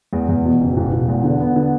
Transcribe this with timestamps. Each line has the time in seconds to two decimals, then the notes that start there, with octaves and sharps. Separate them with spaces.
0.13 E2
0.29 E2
0.45 B2
0.61 F#1
0.77 E1
0.93 E1
1.08 E2
1.24 D3
1.40 B3
1.56 D3